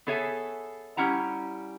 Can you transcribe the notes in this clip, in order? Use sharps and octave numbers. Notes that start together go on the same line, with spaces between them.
B3 G#4 A4 C#5 E5 G#5
G3 C#4 E4 F#5 A#5